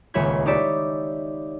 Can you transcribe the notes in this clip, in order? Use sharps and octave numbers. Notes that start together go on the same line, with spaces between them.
D#1 C#2 C#5 E5 B5 G#6
D#4 G4 C#5 D5 E5